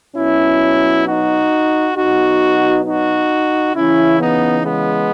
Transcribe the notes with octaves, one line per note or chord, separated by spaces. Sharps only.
B2 F#3 C#4 E4
D#4 F#4
B2 F#3 D#4 F#4
D#4 F#4
C#3 E3 C#4 E4
B3 D#4
G#3 B3